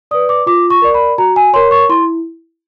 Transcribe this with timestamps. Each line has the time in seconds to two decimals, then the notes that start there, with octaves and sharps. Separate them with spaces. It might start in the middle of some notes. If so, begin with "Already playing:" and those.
0.11 B4 D5 D#6
0.29 D6
0.46 F4 D6
0.70 C#6
0.82 A#4 D5
0.94 B5
1.18 F#4 A#5
1.36 G#5
1.53 A#4 C#5 C6
1.71 C#6
1.89 E4 C6